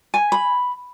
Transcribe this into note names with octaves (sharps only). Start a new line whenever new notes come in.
G#5
B5